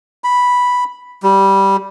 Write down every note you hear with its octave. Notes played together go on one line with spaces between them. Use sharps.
B5
G3